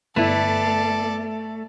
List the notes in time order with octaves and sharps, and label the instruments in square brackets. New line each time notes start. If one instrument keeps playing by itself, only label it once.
[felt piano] G1 [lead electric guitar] A3 [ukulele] E4 B4 [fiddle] A4 D5